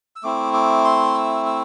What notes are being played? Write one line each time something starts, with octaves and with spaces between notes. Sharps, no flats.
E6
A3 C4 E4 D6
D6
C6
E6
E6